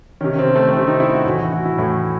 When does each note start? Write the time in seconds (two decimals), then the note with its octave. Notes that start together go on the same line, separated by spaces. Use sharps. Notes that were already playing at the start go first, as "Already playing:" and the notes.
0.21 C3 D#3 C#4
0.39 C4
0.56 A3
0.68 A3
0.73 C3 D#3 C4
0.87 D#4
1.00 E4
1.13 F#4
1.25 A2 E3 F#4
1.39 E4
1.53 F#4
1.65 E4
1.78 A2 E3 A3